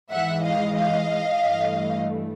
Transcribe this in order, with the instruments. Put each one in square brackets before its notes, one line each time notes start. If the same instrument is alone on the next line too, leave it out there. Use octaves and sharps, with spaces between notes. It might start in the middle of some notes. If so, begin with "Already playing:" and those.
[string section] G#2 E3 G#3 E5 F#5
D#5 F5
D#5 F5
G2 E3 A3